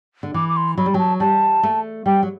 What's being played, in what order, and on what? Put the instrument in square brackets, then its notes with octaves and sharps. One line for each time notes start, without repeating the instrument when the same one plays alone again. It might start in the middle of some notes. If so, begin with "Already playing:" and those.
[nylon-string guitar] D3
[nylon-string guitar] E3 [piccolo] D6
[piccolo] D6
C6
[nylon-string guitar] F#3 [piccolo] B5
[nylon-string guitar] G3
[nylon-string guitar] F#3 [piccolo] G5
[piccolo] A5
[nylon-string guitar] G3 [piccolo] A5
[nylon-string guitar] A3
[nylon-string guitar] G3 [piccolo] G5
[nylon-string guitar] F#3